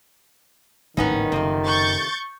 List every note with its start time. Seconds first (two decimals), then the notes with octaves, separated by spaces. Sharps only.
0.97 D1 G#1 D#3 E3 B3 C#4 D#4
1.32 F#1 C3 F3 A3
1.66 C#6 G6 A6